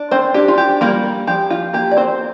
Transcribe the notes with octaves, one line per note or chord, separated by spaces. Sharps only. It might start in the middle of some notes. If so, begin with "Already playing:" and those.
Already playing: D4
C4 C5
D4 G4
F4
G4
G3 A#3 A#4
F3 G4
F4
A#3 G4
D5
C4 C5